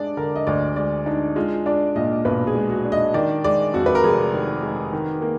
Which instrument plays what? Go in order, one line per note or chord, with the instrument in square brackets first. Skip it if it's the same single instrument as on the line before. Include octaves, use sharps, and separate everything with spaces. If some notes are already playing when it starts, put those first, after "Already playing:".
Already playing: [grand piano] G#3 D4 [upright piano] D5
[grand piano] D3 [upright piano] A#4
[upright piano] D#5
[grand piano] D2 [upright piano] D5
[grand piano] G#3 [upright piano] D5
[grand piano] D4 [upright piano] D#4
[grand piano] G#3 [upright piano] F4
[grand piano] D4 [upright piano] D5
[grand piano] A#2 [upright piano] D#5
[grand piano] B1 [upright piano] B4
[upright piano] G#4
[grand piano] G#3
[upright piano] F#4
[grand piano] D4
[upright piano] D#5
[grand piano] D#3 [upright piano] D5
[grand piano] G#3 [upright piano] D5
[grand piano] F2 [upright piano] F#4
[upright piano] B4
A#4
[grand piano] F1 [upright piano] G#4
[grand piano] D#3
G#3
D#3
A#3